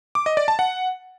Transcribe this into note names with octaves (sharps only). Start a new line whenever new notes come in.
D6
D#5
D5
A5
F#5